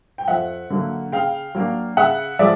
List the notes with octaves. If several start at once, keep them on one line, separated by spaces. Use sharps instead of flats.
G5
F2 E5 F#5
D3 F#3 A#3
C#3 F5 G5
F#3 A#3 D4
C#3 E5 F#5
F3 G#3 D5 E5